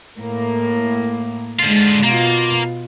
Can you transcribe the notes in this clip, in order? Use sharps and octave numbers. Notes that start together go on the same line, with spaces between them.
A2 A#3
G#2 D3 G#3 F4
B2 A#3 F4 F5